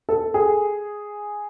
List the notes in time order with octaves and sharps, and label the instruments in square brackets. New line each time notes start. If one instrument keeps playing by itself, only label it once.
[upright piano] A4
G#4